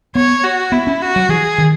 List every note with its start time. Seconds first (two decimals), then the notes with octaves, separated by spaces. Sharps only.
0.15 B3 C#5
0.44 F#4
0.72 B3 E4
0.87 C#4
1.02 F#4
1.16 F#3
1.29 E3 G#4
1.58 D#3